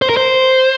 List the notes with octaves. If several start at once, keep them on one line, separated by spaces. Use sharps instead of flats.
C5
A#4
C5